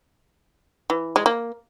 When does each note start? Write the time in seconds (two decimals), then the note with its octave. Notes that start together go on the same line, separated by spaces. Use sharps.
0.90 E3
1.16 G#3
1.26 A#3